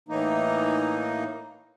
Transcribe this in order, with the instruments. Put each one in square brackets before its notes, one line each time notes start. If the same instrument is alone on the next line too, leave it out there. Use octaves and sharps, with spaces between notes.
[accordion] A2 E3 A#3 D#4